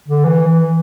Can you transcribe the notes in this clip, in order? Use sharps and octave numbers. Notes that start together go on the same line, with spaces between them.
D3
E3
E3